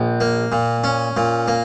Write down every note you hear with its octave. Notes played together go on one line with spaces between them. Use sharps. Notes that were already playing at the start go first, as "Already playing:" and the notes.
Already playing: A#1
A#3
A#2
C#4
A#2
A#3